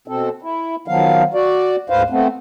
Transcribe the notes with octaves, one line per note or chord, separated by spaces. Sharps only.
B2 C4 A4
E4
D#3 F3 F#3 B3 F5
F#4 D5
D2 G#2 B4 C5 F5
A3 B3 C4